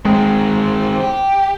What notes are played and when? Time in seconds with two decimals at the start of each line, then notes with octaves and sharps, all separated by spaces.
0.05 D#3 G#3 C4
1.01 G4